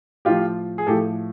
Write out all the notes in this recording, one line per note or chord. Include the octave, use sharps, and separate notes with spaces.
A2 F3 F4 G4
G#4
A2 F3 G4 A4